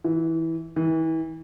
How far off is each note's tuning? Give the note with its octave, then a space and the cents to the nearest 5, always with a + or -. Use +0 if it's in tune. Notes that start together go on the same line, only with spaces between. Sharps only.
E3 -15
E3 -35